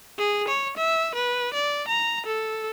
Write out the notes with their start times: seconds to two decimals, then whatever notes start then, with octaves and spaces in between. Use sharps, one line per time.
0.18 G#4
0.48 C#5
0.77 E5
1.15 B4
1.54 D5
1.88 A#5
2.26 A4